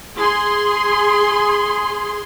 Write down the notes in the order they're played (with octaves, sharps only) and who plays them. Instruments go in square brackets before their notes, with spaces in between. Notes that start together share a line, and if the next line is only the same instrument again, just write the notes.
[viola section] G#4 C6